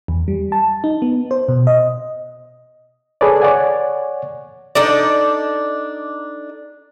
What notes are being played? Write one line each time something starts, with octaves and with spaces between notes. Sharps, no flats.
E2
G3
A5
D#4
B3
C5
B2
D#5
G#4 A4 B4 C#5 D5
C#5 D5 F#5 G#5
D4 D#4 A4 D5